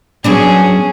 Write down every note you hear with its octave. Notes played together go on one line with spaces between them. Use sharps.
F#3 B3 C#4 D4 G#4